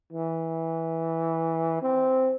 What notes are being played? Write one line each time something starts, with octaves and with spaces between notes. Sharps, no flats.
E3
C4